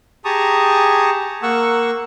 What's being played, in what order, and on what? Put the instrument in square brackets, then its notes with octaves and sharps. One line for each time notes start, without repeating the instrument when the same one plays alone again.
[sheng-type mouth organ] G4 G#4 A5 A#5 C#6 D#6
A#3 F#5 C#6 E6